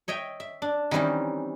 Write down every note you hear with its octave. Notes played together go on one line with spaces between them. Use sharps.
C#5 D#5 E5 G5
E5
D4
D#3 E3 G3 C4 C#4 D#4